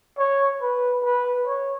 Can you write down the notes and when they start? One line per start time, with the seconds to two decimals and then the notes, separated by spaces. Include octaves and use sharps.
0.19 C#5
0.61 B4
1.04 B4
1.46 C#5